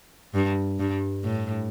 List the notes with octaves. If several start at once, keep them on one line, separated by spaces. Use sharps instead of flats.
G2
G2
A2